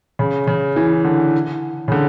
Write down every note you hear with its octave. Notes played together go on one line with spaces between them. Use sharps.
C#3
C#3
E3
D3
C#3
D3